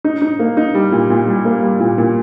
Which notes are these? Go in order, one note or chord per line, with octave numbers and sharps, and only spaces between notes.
D#4
D#4
A#3
D#4
G3
A#2
A#2
G3
A#3
G3
A#2
A#2